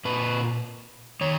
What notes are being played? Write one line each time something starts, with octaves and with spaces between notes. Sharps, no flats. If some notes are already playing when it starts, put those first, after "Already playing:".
A#2 B4
D#3 C#5